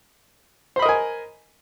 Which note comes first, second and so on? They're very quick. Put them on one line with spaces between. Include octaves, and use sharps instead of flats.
C5 B5 D#5 A#4 G#5